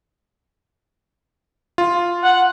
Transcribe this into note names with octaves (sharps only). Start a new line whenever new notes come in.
F4
F#5